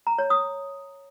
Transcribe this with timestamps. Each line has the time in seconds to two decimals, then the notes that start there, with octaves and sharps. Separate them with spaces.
0.07 A#5
0.18 C#5
0.30 D#6